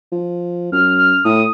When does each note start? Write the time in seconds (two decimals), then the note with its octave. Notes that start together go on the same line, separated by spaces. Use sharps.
0.12 F3
0.72 F#2 F6
0.98 F6
1.25 A2 D#6